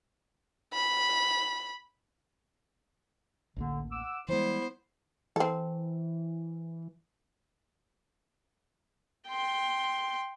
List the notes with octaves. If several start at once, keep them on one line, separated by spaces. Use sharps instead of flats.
B5
A1 D2 D3 A#3
F#5 D6 E6
E3 F3 G3 G#3 B3 E4 C5
E3 C4 A4
G5 C6